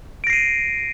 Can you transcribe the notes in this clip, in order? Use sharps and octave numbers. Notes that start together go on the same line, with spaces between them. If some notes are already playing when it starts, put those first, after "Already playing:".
A#6 C7 D7 D#7